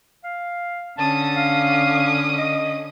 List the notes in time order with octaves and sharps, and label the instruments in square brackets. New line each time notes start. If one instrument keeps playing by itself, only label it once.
[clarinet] F5
[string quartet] D3 C#4 D#6 [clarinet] A5
[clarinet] F5
D#5